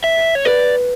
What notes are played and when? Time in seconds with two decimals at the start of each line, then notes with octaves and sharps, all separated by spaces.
0.04 E5
0.35 C#5
0.45 B4 D5